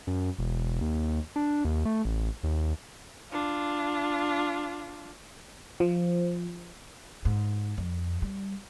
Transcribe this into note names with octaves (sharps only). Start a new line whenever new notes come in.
F#2
E1
D#2
D4
D#2
A3
A1
D#2
D4 F4
F3
G#2
F2
G3